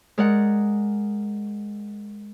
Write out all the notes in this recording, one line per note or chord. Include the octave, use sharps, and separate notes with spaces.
G#3 A#4 D5 F#5